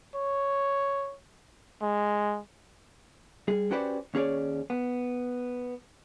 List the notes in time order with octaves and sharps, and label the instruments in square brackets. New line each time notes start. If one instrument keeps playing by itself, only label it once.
[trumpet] C#5
G#3
[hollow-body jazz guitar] G3 G#4
C#4 F#4 G4 B4 C5 D5
D#2 C#4 G#4 C#5 D5
B3